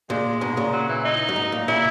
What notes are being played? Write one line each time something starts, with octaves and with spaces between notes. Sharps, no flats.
A#2 G#3
G#2 B2
A#2 C#3
F#3
E3
D#4
F#2
G#2
A#2
A#2 C#3 E4